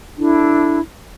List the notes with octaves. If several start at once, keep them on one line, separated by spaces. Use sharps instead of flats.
D4 E4 A4